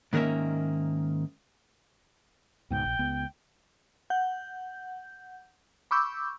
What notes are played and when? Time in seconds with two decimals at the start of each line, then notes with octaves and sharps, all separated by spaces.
0.13 G#2 D#3 G#3 A#3 C#4 E5
2.70 C#2 G#2 B2 G5
2.86 A#1
2.99 C#2 B3
4.10 F#5 G6
5.91 B5 C#6 D6 E6 G6